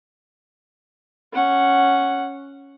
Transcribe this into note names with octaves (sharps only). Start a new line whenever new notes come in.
C#4 F#5